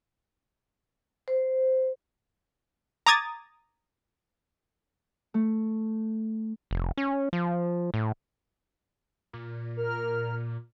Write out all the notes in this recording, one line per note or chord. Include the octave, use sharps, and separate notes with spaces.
C5
A#5 D6 D#6 G#6 A6
A3
F1
C#4
F3
A2
A#2
A#4 F6